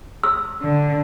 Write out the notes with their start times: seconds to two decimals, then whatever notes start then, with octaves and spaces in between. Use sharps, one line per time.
0.24 E6
0.62 D3